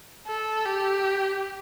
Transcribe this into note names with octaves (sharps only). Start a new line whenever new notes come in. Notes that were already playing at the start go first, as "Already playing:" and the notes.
A4
G4